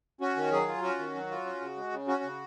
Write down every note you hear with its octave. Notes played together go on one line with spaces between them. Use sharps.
C#4 F#4
D#3
F#3 G#4
F4
C#4 F#4
D#3
F#3
F4
C#4
C#3
G#3
C#3
C#4 F#4
C#3